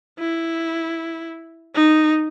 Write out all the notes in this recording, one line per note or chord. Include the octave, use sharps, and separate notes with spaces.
E4
D#4